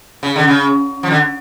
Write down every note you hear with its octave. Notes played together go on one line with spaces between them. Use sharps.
C#3
D3
C#3
F3
D3